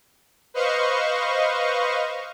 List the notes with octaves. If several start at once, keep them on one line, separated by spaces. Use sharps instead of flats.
B4 C5 D#5 F5 C#6